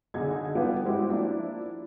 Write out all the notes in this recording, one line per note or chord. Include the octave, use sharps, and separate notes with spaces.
B1 D3 D#4 G#4 G#6
F3 G3 B3 F4 G4 B4
G3 G#3 C4 E4 F#4 G4
F3 A#3 D4 E4